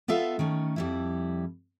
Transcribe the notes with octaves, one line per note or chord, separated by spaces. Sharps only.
B3 F4 A4 E5 F5
D#3 A3 C#4
F2 G3 E4